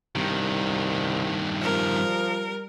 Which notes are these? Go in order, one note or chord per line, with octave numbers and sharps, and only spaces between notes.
C2 G2 D#3
F3 G3 A#4